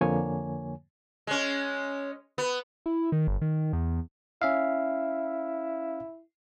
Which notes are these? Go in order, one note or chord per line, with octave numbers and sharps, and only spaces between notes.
F2 D3 F3 A#3 C#5 G#5
G#3 C#4
B3
E4
D#3
G1
D#3
E2
C#4 E4 E5 F5